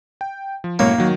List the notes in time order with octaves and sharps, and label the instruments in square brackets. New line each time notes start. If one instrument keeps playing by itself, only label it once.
[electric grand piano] G5
F3
[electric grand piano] F#2 A2 C#5 [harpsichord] A#3
[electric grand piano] D#3 F#3